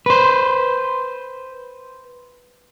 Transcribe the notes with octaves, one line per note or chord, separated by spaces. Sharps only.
B4 C5